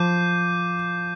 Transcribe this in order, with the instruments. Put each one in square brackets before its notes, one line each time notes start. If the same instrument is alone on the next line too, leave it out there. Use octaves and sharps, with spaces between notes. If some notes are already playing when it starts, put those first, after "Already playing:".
Already playing: [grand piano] F3 [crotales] D6 G6 C7 D#7